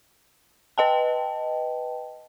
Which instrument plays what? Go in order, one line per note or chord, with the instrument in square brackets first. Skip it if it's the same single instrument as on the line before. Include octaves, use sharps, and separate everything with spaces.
[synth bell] B4 D#5 G5 A5